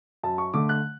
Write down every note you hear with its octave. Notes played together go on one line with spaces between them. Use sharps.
F#2 A5
C#6
D3 A3 D6
F#6